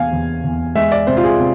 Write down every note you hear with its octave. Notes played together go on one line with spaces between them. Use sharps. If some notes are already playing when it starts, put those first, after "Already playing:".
Already playing: E2 C3 F5 G#5
E2
E2
G#3 E5
D5
C3 C5
F4
G#4
C3